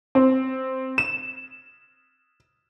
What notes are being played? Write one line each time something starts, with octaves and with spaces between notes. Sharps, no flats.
C4
E7